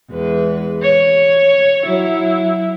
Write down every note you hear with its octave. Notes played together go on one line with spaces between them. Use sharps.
E2 G#3 B4
C#5
F#3 E4